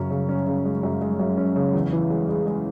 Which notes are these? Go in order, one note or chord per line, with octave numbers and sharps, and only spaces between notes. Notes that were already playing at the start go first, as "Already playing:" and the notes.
Already playing: F#2 C#3 C#4
C#3
C#4
C#3
G#3
F#2
G#3
F#2
C#4
C#3
E2
E3
G#3
G#3
G#3